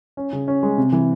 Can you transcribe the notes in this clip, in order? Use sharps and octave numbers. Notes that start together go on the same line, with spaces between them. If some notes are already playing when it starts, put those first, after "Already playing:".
C#4
C#3
C#4
G#3
C3
E3